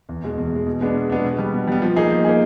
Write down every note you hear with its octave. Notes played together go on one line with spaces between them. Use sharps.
E2
B2 G#3
E2
B2 G#3
B2
G#3 B3 D4
B2
G#3 B3 D4
B2
G3 B3
B2
G3 B3
F3
A#3 D#4 G#4
F3
A#3 D#4 G#4